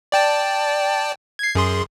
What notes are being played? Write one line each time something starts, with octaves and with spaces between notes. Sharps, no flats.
D5 G5 A5
G#6 C7
F#2 G#4 C6